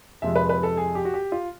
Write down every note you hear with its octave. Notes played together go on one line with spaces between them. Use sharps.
F2 C3 F3 G#3 E5
B4
B4
A4
G#4
G4
F#4
G4
F4